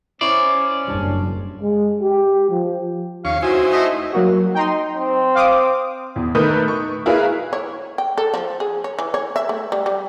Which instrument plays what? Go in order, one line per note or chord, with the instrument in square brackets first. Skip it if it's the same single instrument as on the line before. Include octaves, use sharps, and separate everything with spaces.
[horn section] C#4 [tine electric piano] E4 C#6 [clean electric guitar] C5 D5
[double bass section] F#1 F#2 [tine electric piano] G3 D4
[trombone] G#3
G4
F3
[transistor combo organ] D#2 C#4 C#6 [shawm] F5
[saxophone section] C3 E3 F#3 [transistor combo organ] D#4 E4 C5 [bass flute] F#4 [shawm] G#5
[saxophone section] A3 [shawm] D#5
[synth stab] F#3 A#3 F#4
[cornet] D#4 [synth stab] G5 A#5 C6
[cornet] C4
[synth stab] F5 D6 D#6
[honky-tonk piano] E2
D#3 A3 A#4 B4 D#6 G6
C#6
E4 G#4 A#4 B4 F5
[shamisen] C#5
G5
A4
F3
G#4
C#5
E3
C#5
E5
A3
G3
G3